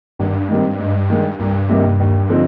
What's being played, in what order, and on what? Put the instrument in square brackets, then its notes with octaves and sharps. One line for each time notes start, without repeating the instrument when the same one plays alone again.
[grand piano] G#1 [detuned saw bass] G2
[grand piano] G#2 D#3 G3 C4
G#2
D#3 G#3
[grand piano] C2 [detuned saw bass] G2
[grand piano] C3 D#3 G3 A#3
D#2
D3 F3 C4 D#4